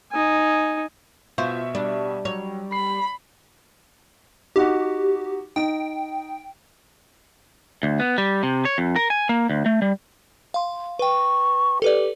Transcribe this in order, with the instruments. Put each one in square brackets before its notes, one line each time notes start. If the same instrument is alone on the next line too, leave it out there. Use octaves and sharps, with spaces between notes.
[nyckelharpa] D#4 G#5
[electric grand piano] B2 E5 C#6 [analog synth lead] F4 [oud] C5
[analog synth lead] G3 [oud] D4
[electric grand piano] F#3 [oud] C#5
[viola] B5 [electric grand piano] C7
[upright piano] D#4 F#4 F#5 [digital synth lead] G4
[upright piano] D#4 D7 [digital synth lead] G5
[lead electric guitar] D2
B3
G3
C3
C#5
F2
A#4
G#5
A#3
D2
A3
G3
[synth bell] F5 C6
[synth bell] B4 G5 [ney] C#6
[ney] G4 [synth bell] A4 B4 D5